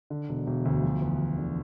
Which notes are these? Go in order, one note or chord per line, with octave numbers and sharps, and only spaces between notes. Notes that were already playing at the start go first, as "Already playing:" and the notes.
D3
E1
E1
D2
F3
E2
E2
D3